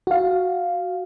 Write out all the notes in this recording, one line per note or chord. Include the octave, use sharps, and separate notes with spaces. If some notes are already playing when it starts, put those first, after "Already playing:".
F#4 F5